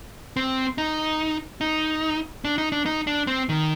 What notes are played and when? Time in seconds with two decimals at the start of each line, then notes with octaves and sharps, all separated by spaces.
0.37 C4
0.78 D#4
1.61 D#4
2.44 D4
2.58 D#4
2.72 D4
2.86 D#4
3.07 D4
3.27 C4
3.49 D#3